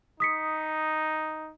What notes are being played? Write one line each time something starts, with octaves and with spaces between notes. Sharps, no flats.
D#4 D#6 B6 C#7